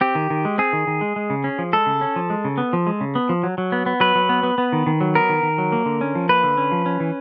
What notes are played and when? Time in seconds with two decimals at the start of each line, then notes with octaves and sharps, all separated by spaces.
0.01 C4 G4
0.15 D#3
0.30 D#3
0.45 G#3
0.58 C4 G#4
0.73 D#3
0.87 D#3
1.01 G#3
1.16 G#3
1.30 C#3
1.44 C#4
1.58 F3
1.73 G#3 A4
1.86 C#3
2.01 C#4
2.16 F3
2.30 G#3
2.45 C#3
2.58 B3
2.73 F3
2.87 G#3
3.01 C#3
3.15 B3
3.29 F3
3.43 F#3
3.58 F#3
3.72 B3
3.86 B3
4.00 F#3 B4
4.15 F#3
4.29 B3
4.43 B3
4.58 B3
4.73 D#3
4.87 D#3
5.01 F#3
5.15 B3 A#4
5.29 D#3
5.43 D#3
5.58 F#3
5.72 A#3
5.86 D3
6.01 C#4
6.15 F3
6.29 A#3 B4
6.43 D3
6.57 C#4
6.72 F3
6.86 C#4
7.00 E3